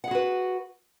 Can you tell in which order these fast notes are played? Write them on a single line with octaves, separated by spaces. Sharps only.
F#5 G#4 F#4 B4